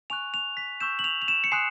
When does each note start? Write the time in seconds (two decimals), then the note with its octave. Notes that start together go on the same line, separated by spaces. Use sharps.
0.10 G#5 C#6 F#6 F7
0.34 F7
0.57 B6
0.80 C#6 E6 G6 E7
0.99 F#7
1.04 F7
1.22 F7
1.28 E7
1.44 C#7
1.52 G#5 C6 D#6 F#6 C7